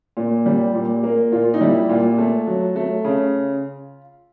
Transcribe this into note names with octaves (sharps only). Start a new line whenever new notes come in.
A#2
G3
A#2
A#3
A#2 F4
D#4
G3 E4
A#2 F4
A3
F#3
A3
C#3